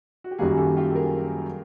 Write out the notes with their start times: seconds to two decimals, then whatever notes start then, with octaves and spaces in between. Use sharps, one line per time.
0.24 F#4
0.31 G4
0.38 F#2 D#3 G3 A#3 F#4 G#4
0.57 G4 A4
0.77 F4 G4
0.90 A4
0.96 G#4 A#4